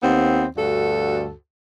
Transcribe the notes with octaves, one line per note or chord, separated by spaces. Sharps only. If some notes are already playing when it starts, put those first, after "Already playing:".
D#2 B3 C4
D2 G2 F#4 A4